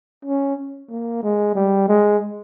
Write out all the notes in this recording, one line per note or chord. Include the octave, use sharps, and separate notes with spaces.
C#4
A#3
G#3
G3
G#3